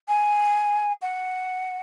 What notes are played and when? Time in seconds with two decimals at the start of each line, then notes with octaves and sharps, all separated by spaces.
0.08 G#5
1.02 F#5